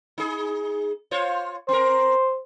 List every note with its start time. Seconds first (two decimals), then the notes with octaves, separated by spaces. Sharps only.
0.18 D#4 G#4
1.11 F4 C5 C#5
1.69 C4 A#4 C5